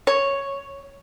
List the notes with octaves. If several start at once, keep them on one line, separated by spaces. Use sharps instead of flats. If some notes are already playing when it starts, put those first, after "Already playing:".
C#5